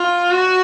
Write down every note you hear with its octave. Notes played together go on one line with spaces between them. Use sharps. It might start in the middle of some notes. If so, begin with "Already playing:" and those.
Already playing: F4
F#4